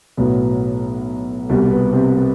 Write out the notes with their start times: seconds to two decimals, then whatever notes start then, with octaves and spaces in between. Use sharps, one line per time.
0.17 B1 A2 F#3 B3
1.49 C2 B2 G3
1.71 B3
1.93 C3 C4
2.15 B3